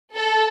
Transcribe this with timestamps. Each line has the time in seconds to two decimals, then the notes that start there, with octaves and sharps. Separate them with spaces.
0.14 A4